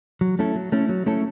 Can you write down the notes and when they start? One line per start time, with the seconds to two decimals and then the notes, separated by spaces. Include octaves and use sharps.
0.21 F#3
0.39 A3 C#4 E4 A4
0.56 F#3
0.72 A3 C#4 E4 A4
0.89 F#3
1.06 A3 C#4 E4 A4